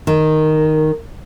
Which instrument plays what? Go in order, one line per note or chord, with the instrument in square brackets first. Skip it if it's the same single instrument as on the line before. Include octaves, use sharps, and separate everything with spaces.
[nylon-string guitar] D#3